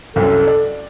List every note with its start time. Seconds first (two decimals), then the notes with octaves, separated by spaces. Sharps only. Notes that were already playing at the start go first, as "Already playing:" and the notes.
0.16 C2 F#2 A4
0.47 D5